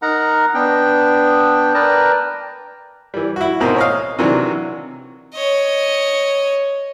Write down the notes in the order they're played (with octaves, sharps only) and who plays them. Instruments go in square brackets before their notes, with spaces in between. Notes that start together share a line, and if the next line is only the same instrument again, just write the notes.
[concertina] D#4 A#4 F#5 A#5
B3 D4 G5
A#4 B4 D5 G5 A5 A#5
[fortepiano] E3 G3
E4 F#4
G#2 B2 A#3 C4 D#4
C#5 D#5 F5
C3 D#3 E3 F#3 D4
[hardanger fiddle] C#5 D#5